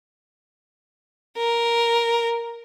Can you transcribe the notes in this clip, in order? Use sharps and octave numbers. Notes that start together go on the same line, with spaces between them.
A#4